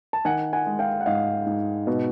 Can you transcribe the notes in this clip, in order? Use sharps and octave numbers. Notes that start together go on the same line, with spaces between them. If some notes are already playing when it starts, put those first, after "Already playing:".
A5
D#3 F#5 G#5
F#5 G#5
G#3
F5 G5
F#5
G#2 D#5 F5
G#2
B2